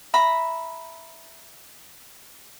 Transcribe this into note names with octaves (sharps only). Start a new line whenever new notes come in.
E5 A#5 B5